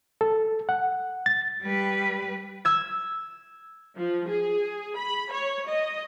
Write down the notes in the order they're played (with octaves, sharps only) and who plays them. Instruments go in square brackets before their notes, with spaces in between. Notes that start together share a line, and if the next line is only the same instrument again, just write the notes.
[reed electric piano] A4
F#5
A6
[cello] G3 B4
[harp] E6 G#6
[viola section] F3
G#4
B5
C#5
D#5